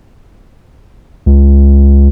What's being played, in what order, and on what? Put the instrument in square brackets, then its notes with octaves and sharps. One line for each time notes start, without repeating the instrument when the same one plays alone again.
[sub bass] C#2